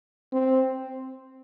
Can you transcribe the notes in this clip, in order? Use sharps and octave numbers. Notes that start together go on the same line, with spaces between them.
C4